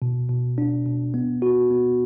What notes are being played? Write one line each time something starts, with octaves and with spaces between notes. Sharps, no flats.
B2
B2
D4
B2
B3
F#4
B3